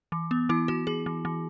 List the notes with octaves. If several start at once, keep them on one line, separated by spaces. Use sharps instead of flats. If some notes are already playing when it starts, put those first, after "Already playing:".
E3
B3
E3 E4
E3 F#4
E3 G#4
E3
E3